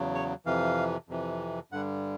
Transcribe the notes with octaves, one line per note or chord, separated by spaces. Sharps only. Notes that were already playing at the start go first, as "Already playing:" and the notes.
Already playing: E2 C#3 F#3
C#5
F2 C3 E3 F5
F2 C3 E3
G2 D3 G3 F#5